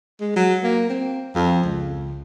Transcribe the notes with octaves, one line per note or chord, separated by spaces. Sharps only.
G#3
F#3
A#3
C4
F2
C#2